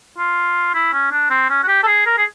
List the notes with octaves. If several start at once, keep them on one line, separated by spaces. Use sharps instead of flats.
F4
E4
C#4
D4
C4
C#4
F#4
G4
A4
G#4
A#4
G#4